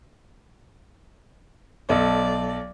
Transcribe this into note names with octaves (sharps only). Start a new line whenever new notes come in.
B1 F#3 A4 D5 D#5